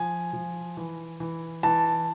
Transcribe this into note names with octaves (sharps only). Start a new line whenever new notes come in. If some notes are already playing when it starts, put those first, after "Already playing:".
Already playing: F3 G#5
F3
E3
E3
E3 A5